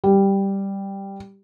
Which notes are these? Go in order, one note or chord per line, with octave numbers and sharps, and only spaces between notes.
G3